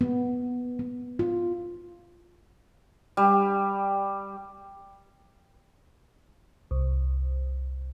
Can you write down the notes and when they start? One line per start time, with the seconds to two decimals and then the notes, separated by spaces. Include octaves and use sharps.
0.01 B3
0.79 B3
1.19 F4
3.17 G3
6.71 C2